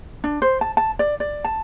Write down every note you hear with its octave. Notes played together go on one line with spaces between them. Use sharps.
D4
C5
A5
A5
D5
D5
A5